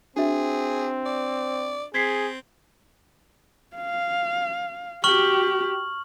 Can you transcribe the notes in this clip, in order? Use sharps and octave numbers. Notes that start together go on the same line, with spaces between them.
C4 D4 F#4 G#4 E5
D5
C4 G#4 G#6 B6 C7
F5
F#4 G4 C#6 F6 F#7